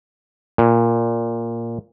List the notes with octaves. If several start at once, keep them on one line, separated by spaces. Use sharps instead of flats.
A#2